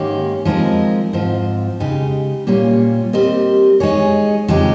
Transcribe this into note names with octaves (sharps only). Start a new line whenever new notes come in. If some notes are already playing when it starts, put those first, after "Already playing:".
Already playing: G#2 D#3 A#3 C#4 G4
F3 G#3 C4 D#4 A#4
G#2 F3 C4 F4
C#3 G#3 D#4 G4
A#2 G3 A#3 C#4 F4
G3 C4 G4 A#4 D#5
G#3 D#4 G#4 C#5
F2 C#3 G#3 D#4 G4